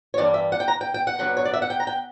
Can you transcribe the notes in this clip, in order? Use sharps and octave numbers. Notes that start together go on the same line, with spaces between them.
C#5
G2 E3 G3 A#3 D4 D5
E5
F#5
G5
A#5
G5
G5
F#5
G2 D3 F#3 B3
C#5
D5
E5
F#5
G5
A#5
G5